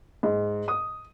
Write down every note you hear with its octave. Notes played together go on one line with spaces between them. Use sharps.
G#2
D#6